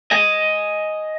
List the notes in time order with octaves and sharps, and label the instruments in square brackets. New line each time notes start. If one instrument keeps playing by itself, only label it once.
[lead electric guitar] D#5 G#5